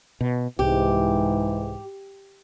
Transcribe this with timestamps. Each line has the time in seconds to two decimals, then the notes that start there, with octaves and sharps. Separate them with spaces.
0.21 B2
0.59 C2 G#2 E3 G4